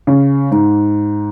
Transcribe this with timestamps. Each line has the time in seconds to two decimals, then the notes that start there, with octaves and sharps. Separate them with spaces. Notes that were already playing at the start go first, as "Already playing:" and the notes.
0.07 C#3
0.51 G#2